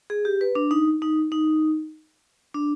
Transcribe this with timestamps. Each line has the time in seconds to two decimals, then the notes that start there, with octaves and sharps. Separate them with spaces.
0.10 G#4
0.25 G4
0.41 B4
0.55 D4
0.71 D#4
1.02 D#4
1.32 D#4
2.54 D4